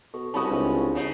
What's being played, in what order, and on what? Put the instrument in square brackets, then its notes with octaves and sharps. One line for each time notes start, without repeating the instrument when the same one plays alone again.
[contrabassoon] B2 [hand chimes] A4 C#6
[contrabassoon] C2 [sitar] C#4 F#4 [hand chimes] A5 B5 D#6
[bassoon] C#2 [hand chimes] D4
[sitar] C#3 D#4